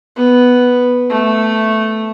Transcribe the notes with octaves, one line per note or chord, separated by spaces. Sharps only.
B3
A3